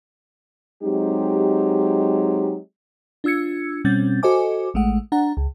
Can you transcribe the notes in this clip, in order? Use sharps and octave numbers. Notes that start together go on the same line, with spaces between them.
F#3 G#3 C4 D#4 G4
D4 F4 E6 G#6 C#7
B2 G3 C4 C#4 G6 A6
F#4 A4 C5 D#5 G#5 D6
A1 G#3 A3 F#5
D4 F#5 A#5
C#2